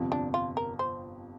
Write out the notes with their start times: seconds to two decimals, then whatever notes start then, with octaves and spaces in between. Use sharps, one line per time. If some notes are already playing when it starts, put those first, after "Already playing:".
Already playing: G1 F2 C3 F3
0.12 D4
0.34 F4
0.57 A#4
0.79 C5